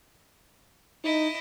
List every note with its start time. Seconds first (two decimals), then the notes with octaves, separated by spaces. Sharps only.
1.04 D#4 E4 D#5